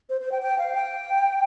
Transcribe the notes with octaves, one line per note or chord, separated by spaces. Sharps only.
C5
C5
G5
G5
F5
G5